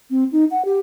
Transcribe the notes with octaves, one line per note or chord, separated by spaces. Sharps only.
C4
D#4
F#5
G4